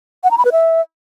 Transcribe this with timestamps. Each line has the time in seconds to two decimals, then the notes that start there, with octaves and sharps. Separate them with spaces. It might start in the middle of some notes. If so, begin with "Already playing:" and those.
0.24 F#5
0.31 A#5
0.38 B5
0.45 B4
0.52 E5